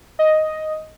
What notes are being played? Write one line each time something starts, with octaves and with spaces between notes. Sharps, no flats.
D#5